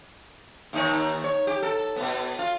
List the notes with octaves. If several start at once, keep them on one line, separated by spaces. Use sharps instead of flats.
D#2 D#4 C#5
C#5
G4
A4
B2 B3
F4